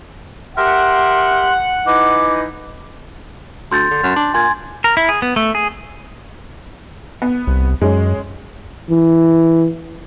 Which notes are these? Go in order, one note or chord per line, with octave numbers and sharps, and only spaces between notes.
G4 A#4 E5 F#5 C6
E3 D#4 D6
D2 C6 G6 A6
D3
F#2
D4
A#2 G#5 C6 G#6
A#4
E4
G#4
B3
A3
G#4
B3
C2
F#2 G#3 C#4
E3